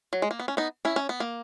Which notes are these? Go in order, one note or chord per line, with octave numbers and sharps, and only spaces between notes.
F#3
G#3
A#3
B3
C#4
B3 D#4
C#4 E4
C#4
B3
A#3